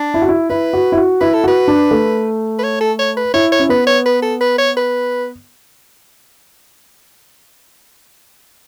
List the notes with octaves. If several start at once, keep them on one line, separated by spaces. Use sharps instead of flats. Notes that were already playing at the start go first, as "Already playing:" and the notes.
Already playing: D4
E4
F#4
E4
E4 B4
F#4
E4
F#4
E4 B4
A4
F#4 B4
D4
A3
B4
C#5
A4
C#5
B4
E4 C#5
C#5
C#4
B3 B4
C#5
B4
A4
B4
C#5
B4